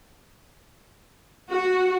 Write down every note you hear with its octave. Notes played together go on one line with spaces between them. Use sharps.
F#4